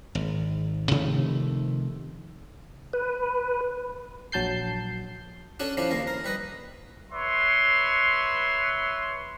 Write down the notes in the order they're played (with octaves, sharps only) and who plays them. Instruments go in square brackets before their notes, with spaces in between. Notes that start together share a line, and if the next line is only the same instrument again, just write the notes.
[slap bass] G#1
C3 D#3 F3 A3
[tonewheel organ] B4
[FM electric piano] A#1 F#3 A5 G6 C7
[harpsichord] C#4 D4 F#4 A4 C#5
F3 C#4 D4 E4 G4
D#2 G#3 A#3
A#4
G3 B4 D#5
[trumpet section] B4 C#5 E5 C6